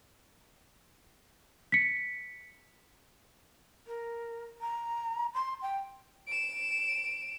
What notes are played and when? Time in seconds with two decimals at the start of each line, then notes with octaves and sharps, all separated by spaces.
1.72 B6 C#7
3.87 A#4
4.61 A#5
5.34 C6
5.62 G5
6.28 D7 E7